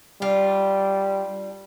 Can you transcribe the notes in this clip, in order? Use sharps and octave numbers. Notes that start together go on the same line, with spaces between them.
G3 D4 F4